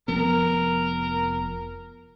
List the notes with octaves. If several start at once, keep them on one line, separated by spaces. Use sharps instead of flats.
F1 F3 B3 A#4